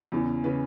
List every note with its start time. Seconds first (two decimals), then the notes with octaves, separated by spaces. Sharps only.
0.12 E2 C#3 E3
0.44 C#3 E3 B4